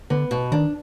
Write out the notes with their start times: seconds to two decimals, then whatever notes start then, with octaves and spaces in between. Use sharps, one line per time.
0.10 D3 B3
0.31 B2
0.52 D#3 D4